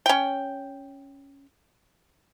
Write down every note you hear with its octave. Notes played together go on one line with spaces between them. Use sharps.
C#4 G5